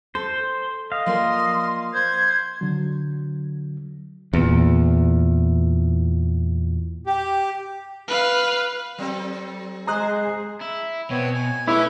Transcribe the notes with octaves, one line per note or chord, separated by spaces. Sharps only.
A4 C5
D#5 F5
F3 A#3 D5 C6
C5 G#6
D3 F#3
E2 A#2
G4
B4 F5
F#3 C4 A4
G#3 G#4 C5 A#5 D#6 F#6
E4
B2 B3 C4 C#5
G#5
A3 C#4 E4 B4 D6